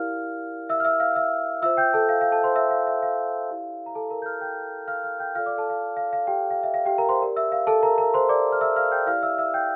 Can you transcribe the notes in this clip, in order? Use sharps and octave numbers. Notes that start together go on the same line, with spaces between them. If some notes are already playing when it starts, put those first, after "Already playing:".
Already playing: E4 G4 A#4 D5 F5 F6
E5 E6
F6
E5 E6
F5 F6
E5 E6
F4 C5 E5 E6
G5 G6
A4 A5
F5
F5
A4 A5
C5 C6
E5 E6
F5
E5
F5
E4 G4 D5
A#5
A4 A5
A#4 A#5
G6
F5 F6
G5 G6
F5 F6
F5 F6
G5 G6
F4 A4 D5 F5 F6
D5 D6
A4 A5
F5
F5
F5
G4 G5
F5
E5
F5
G4 G5
A#4 A#5
C5 C6
G4 A#4 D5
E5 E6
F5
A4 A5
A#4 A#5
A#4 A#5
C5 C6
D5 D6
F6
E5 E6
F5 F6
G5 G6
E4 G4 D5 F5 F6
E5 E6
E5 E6
G5 G6